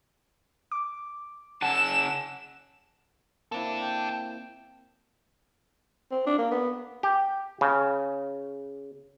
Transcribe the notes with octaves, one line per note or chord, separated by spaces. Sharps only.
D6
C#3 F#5 G#5 A5 E6 E7
A#3 C4 D4 E4 A4
G5
C4
D4
A#3
B3
G4
C#3